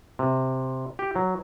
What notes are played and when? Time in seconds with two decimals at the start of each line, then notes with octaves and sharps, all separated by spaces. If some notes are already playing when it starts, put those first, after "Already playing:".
0.19 C3
0.99 G4
1.16 F#3